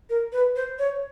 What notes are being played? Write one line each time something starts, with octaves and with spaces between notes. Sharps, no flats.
A#4
B4
C5
C#5